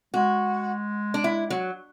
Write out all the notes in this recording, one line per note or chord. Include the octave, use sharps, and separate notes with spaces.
G#3 F#4
D4
E4
F#3